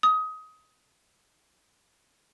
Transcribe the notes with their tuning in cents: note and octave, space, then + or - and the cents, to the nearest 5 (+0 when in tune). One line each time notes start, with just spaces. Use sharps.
D#6 +20